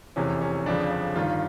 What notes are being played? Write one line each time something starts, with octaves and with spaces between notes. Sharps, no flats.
F1 E2 C3 E3 C#4
C#4
G1 F2 C#3 F3 D4
D4
G1 G2 D#3 F4